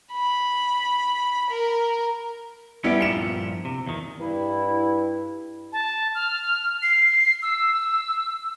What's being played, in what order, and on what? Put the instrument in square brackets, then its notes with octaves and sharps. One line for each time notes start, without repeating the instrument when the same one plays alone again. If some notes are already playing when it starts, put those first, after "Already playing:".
[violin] B5
A#4
[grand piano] G3 B3 E4 [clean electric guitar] C#4 G4
[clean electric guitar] G2 A#2 F3 [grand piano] C#7 E7
[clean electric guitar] C3
E2 D#3
[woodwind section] G2 E4
[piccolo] A5
F6
C7
E6